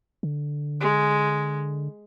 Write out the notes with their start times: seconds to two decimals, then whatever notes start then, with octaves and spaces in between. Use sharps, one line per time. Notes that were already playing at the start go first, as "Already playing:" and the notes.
0.23 D3
0.81 G#3